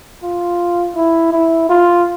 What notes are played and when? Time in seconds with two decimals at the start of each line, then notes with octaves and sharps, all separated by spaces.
0.23 F4
0.96 E4
1.33 E4
1.69 F4